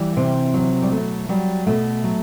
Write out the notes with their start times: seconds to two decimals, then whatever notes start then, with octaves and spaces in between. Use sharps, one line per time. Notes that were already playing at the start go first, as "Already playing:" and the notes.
Already playing: E3 G3
0.17 C3 C4
0.54 F#3
0.82 G3
0.91 B2 A3
1.29 F#3 G3
1.67 B2 A3
2.04 F#3